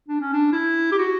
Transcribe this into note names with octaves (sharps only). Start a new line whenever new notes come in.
D4
C#4
D4
E4
G4
F#4